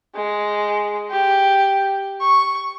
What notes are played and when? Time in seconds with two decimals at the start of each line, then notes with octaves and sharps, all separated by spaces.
0.15 G#3
1.11 G4
2.21 C#6